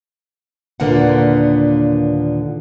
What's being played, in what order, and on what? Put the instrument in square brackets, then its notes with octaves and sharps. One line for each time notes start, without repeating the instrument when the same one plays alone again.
[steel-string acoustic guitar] D#2 A#2 D3 A#3 B3 F#5